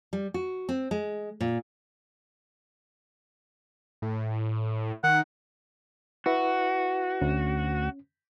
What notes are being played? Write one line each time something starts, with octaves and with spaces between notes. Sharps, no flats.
G3
F#4
C4
G#3
A#2
A2
D#3 F#5
E4 F#4 B4 E5
D2 C#4